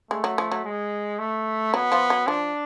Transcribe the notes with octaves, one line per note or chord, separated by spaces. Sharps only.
G#3 A3
F#3
F3
F#3
G#3
A3
F#3 B3
F3
F#3
F3 D4